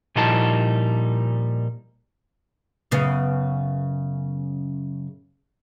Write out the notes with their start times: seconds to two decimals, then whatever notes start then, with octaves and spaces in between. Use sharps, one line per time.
0.16 A#2 F3 G3 D#4 E4 A5
2.91 F#2 C#3 B3